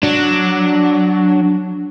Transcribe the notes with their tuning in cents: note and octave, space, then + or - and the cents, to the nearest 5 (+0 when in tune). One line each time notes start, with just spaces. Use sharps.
F#3 +0 D4 +0